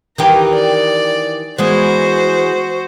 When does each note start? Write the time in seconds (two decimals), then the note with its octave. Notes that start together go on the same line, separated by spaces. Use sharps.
0.18 D#3 E3 G4 A#4 B4
0.54 D5
1.58 E3 G#3 B3 F#4 C5